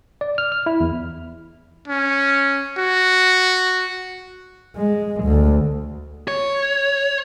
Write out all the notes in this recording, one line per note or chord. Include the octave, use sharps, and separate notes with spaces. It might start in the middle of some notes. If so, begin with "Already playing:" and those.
D5
F6
F6
E4
E2
C#4
F#4
G#3
D2
C#5